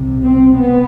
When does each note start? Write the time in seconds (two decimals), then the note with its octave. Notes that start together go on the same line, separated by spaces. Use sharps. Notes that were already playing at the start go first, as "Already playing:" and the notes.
Already playing: C2 C3
0.23 C4
0.57 B3